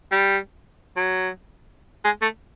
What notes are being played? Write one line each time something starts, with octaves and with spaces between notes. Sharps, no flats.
G3
F#3
G#3
A3